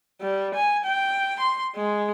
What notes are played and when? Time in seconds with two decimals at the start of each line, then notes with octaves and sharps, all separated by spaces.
0.21 G3
0.54 G#5
0.84 G5
1.40 C6
1.76 G#3